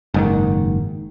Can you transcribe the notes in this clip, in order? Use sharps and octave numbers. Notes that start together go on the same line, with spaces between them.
F#1 G#2 D#3